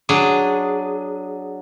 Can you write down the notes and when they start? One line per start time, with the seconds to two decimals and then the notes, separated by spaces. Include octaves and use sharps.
0.09 F#3 D4 G#4